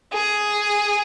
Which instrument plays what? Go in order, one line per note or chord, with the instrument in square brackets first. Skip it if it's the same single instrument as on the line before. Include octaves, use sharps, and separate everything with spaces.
[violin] G#4